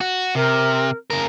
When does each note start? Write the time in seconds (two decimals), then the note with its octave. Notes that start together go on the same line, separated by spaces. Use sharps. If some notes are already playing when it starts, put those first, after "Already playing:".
0.01 F#4
0.35 C3 A#4
1.10 C#3 A#4